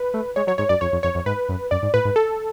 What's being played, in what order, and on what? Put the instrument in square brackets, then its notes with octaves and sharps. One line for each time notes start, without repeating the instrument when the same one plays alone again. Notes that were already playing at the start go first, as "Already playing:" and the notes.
Already playing: [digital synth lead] B4
[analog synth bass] A3
[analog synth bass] G#3 [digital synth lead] C#5
[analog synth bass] F#3 [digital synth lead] C#5
[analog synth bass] G#2 [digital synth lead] C#5
[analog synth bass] F#2 [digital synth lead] D5
[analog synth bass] F2 [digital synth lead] C#5
[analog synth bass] F2
[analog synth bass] F2 [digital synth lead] C#5
[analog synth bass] F2
[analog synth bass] G#2 [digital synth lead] B4
[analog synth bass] F#2
[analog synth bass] F#2 [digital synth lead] D5
[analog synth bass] G#2
[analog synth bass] A2 [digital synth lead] B4
[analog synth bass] G#2
[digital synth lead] A4